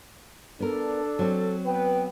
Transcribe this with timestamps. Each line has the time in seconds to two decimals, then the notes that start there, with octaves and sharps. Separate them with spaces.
0.60 B3 D4 A4 A#4
1.19 F#3 C4
1.66 B3 B4 G5